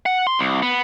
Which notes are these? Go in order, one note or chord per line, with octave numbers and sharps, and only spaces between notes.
F#5
C6
C2
B3